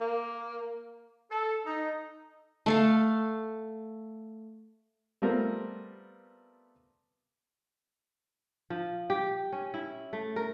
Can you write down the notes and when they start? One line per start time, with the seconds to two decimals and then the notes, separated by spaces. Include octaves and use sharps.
0.01 A#3
1.31 A4
1.66 D#4
2.66 A3 A4 F5
5.22 G3 A3 B3 C4 F4 A#4
8.70 F3
9.10 G4
9.53 C#4
9.74 E4
10.13 A3
10.36 A#4